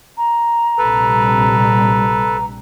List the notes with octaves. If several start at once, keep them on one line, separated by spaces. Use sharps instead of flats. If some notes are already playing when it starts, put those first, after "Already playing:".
A#5
A#1 C3 G3 A4 B4